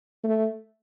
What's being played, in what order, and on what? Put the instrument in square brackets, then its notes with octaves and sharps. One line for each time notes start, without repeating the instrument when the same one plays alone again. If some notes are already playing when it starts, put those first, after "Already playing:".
[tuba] A3